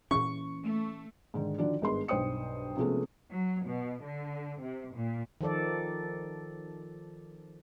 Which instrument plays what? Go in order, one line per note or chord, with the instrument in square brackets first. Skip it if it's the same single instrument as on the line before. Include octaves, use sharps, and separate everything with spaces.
[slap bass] A#2 E3 C#4 [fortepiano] C#6
[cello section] A3
[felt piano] G#2 D3 D#3
D3 D#3 F3 D4 F#4 D5
G#1 G2 G#3 B3 C6
B1 G2 C5 G5 D#6 C#7
C3 F3 G#3 A3 B3 C#4
[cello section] F#3
B2
D3
C3
A#2
[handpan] D#3 F3 A4 D5